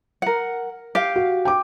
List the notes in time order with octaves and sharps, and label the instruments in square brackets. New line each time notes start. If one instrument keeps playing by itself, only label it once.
[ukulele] A#4 F#5
G4 F5
[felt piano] F#4
G5 D6